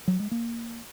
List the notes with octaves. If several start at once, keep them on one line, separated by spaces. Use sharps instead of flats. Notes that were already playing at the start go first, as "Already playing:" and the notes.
F#3
G#3
A#3